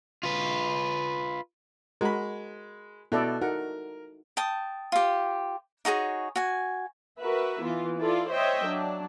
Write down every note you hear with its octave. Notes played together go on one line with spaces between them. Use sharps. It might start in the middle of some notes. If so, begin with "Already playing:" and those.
F4 B4
G#3 F#4 A#4 B5
B2 E4 A4 D5
D#4 F#4 A#4 F#5
G5 A5 D#6
F4 G4
D#4 F#4 G#4 C#5
F#4 G#5
F#4 A#4 B4 E5
E3 B3 F4
E4 F4 A4 D5
C5 C#5 D#5 E5 G5
F#3 D4